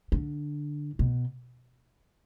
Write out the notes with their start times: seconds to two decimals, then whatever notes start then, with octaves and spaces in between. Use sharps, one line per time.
0.12 D3
0.99 B2